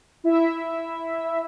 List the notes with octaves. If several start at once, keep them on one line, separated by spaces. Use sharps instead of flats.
E4 E5